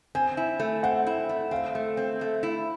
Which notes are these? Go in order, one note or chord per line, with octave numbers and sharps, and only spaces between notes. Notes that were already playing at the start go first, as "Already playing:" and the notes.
C4 G#5
E4
A3
C4 F#5
E4
A3
C4 F5
A3
C4
A3
E4